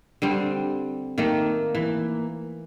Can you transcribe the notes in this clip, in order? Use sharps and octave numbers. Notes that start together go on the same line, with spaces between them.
D3 G3 C4
D#3 A3 A#3
E3